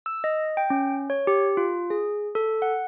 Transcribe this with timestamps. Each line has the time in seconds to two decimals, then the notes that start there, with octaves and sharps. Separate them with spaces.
0.06 E6
0.24 D#5
0.57 G5
0.70 C#4
1.10 C#5
1.27 G4
1.57 F4
1.90 G#4
2.35 A4
2.62 F#5